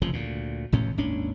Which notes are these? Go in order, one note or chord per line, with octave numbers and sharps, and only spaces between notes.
F1 C#3 F3
D2 A#2
F1 E2 A2 C#4
G#1 D#2 C#4 D4